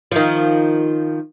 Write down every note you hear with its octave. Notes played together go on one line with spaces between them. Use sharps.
D#3 F3